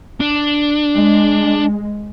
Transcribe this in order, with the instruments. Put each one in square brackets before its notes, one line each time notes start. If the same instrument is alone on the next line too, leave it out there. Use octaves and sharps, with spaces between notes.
[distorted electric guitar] D4
[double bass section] G#3